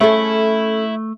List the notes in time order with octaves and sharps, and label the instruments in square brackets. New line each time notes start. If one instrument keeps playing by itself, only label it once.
[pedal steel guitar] A3 [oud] C#4 G#4 A4 [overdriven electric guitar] E4 [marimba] E5